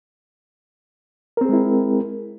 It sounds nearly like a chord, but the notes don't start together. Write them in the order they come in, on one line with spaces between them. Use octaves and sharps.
A#4 C4 G#4 G#3 E4